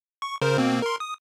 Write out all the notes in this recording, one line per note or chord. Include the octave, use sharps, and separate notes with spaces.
C#6
C#3 A#4 C5
B2 A#3 C4
A#4 C6
D#6